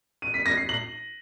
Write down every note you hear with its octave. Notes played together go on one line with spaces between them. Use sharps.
D#7
B6
A#6
C7
F#7